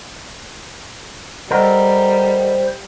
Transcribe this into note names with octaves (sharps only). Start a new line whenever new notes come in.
G3 A4 A#4 C5 D#5 F#5